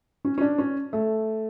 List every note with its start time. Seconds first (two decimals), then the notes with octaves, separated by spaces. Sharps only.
0.25 C#4
0.38 C#4
0.41 D4
0.58 C#4
0.93 A3